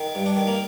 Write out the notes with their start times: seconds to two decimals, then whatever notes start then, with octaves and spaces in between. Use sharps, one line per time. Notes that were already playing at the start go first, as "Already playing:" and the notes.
Already playing: D#3
0.15 G2
0.26 D4
0.36 D#3
0.47 A#3